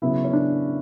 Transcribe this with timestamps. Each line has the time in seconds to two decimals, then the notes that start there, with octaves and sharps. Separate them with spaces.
0.02 C#3 F#3 B3 E4
0.24 C#4
0.33 D4